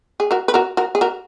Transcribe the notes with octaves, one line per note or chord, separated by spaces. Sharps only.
G#4
F#4 A#4
B4
F#4 A#4
F#4 A#4
G#4
F#4 A#4